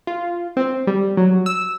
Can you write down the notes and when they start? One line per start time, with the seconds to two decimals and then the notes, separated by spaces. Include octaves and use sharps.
0.07 F4
0.57 C4
0.87 G3
1.17 F#3
1.46 E6